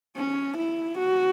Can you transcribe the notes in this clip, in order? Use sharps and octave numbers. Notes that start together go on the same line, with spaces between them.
C#4
E4
F#4